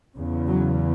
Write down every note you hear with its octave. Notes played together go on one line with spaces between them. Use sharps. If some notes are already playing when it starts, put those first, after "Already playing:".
E2 C#3
F#3